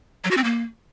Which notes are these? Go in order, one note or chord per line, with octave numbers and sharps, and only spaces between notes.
F#3
F#4
C4
A#3